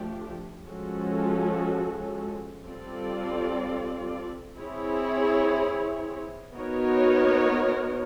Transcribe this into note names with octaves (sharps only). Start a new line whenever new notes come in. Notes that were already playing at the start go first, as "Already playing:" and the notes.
Already playing: F3 A3 D4 G4
F3 G#3 C#4 F#4 A4
G3 C4 F4 A4 D5
C4 E4 G#4 C#5
B3 D#4 F#4 A#4 C#5